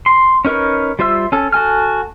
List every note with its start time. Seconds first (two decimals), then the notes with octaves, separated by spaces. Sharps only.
0.06 C6
0.45 C#4 D#4 A#4 B4 C#5
0.99 G3 F4 C5 E5 E6
1.32 C#4 A4
1.52 F#4 A4 G#5 F6